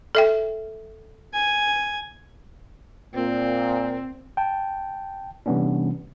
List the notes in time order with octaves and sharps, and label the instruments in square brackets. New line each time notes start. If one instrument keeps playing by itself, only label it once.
[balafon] A4 E5 G5
[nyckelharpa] G#5
[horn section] A#2 [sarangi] C4
[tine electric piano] G5 A5
C3 E3 G3 B3 C#4 D4